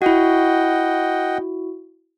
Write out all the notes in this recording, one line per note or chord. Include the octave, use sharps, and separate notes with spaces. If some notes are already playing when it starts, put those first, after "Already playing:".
E4 F#4 D#5 F#5 G5